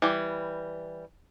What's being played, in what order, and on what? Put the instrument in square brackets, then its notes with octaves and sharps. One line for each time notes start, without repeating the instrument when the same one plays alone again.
[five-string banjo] E3 G3